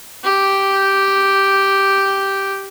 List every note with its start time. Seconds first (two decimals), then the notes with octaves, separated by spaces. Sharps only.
0.24 G4 G5